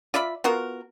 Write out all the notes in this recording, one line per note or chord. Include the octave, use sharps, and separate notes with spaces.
F4 D5 E5 B5
B3 F4 F#4 A#4